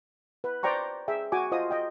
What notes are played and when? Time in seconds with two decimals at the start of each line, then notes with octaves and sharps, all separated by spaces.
0.44 B4
0.63 C5 D5 G5 A#5 C#6
1.08 G#4 E5 G5
1.32 F#4 G#5 D6
1.52 F4 C5 D#5 D#6
1.71 D#5 G5